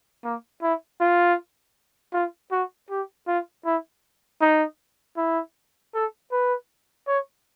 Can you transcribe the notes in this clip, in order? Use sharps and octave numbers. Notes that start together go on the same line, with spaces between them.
A#3
E4
F4
F4
F#4
G4
F4
E4
D#4
E4
A4
B4
C#5